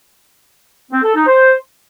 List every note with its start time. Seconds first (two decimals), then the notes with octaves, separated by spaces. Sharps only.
0.92 C4
1.03 A4
1.15 D#4
1.27 C5